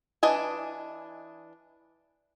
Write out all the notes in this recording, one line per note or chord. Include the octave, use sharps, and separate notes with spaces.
E3 D4 D#5 G#5